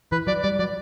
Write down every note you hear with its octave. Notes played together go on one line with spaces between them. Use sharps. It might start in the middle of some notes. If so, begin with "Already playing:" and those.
E3 B4
F#3 D5
G3 D5
F#3 D5